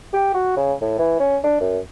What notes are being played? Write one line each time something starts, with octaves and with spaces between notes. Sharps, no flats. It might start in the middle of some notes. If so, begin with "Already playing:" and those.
G4
F#4
C#3
A2
E3
C#4
D4
F#2